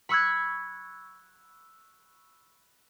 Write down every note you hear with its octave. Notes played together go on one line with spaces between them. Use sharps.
B5 C#6 E6 F#6 G#6